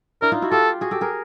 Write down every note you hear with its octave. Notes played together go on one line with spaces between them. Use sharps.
D4 E4 A#4
D#4 F4
E4 F#4
F4 G4 A4
F#4 G#4
G4 A4
G#4 A#4